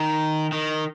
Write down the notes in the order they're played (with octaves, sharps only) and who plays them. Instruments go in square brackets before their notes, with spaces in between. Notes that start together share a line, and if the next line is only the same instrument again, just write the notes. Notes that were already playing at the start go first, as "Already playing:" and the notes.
Already playing: [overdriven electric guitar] D#3
D#3